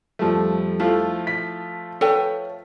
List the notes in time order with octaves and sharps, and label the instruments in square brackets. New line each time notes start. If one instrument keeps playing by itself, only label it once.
[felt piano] F2 G3 [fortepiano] F3 A3
[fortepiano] F3 A3 F4 [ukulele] E4
[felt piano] B6
[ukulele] A4 B4 G5 [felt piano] C#5